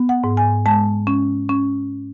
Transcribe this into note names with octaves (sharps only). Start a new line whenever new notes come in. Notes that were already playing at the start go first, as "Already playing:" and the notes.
Already playing: B3
F#5
G#2
G#5
G#3 A5
C#4
C#4